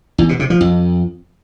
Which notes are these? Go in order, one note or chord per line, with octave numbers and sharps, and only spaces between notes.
E2
B2
C3
F3
F2